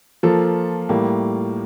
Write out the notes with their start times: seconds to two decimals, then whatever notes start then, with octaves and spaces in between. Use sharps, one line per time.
0.23 F3 A#3 F4 A4
0.89 A2 G3 A#3